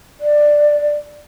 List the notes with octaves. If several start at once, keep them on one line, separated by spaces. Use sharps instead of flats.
D5